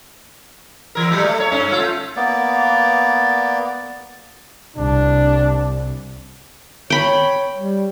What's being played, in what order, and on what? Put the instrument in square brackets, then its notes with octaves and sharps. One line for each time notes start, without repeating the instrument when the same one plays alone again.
[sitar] E3 A#4
A2 F#3 G3
A3
C#5
G2 C#4
A3 F4
[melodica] A#3 B3 D5
[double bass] C2 [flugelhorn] D4
[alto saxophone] C#5 [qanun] G5 B5
[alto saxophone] G3